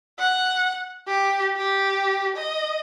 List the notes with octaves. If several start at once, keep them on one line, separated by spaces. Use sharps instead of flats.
F#5
G4
G4
D#5